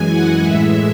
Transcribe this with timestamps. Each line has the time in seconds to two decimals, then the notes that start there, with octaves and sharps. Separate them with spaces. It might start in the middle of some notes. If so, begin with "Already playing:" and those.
Already playing: F#2 E3 G#3 G#5
0.09 F#5
0.42 A2 E3 G#3 E5